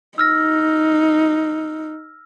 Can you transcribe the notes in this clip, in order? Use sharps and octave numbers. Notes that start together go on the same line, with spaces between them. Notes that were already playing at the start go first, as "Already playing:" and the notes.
D#4 E6 F6 A#6